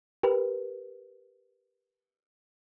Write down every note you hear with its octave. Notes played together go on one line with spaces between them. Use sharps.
G4 A#4 B4